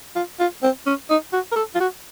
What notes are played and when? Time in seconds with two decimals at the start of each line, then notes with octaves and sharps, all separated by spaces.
0.15 F4
0.39 F4
0.63 C4
0.86 C#4
1.10 D#4
1.33 F#4
1.52 A#4
1.56 A4
1.75 F4
1.80 F#4